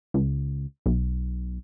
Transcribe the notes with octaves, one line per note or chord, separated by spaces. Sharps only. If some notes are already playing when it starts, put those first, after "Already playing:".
C#2
B1